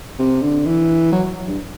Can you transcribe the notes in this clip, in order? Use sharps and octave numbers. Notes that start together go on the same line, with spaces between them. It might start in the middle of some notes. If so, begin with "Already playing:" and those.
C3
D3
E3
F#3
G2